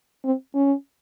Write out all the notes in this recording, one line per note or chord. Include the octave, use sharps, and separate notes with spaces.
C4
C#4